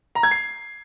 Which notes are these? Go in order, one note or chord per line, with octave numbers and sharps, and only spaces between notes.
A#5
G#6
C7